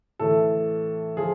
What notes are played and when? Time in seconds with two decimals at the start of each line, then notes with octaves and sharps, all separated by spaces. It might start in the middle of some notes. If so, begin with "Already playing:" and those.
0.19 A2 E3 A4
1.17 F3 G#4